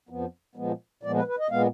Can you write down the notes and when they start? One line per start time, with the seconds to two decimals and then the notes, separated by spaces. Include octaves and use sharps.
0.09 F2 F3 B3
0.56 A#2 F3 G#3 B3
1.03 A#2 F3 G#3 B3 D5
1.16 B4
1.27 B4
1.39 D#5
1.50 A#2 G#3 B3 F5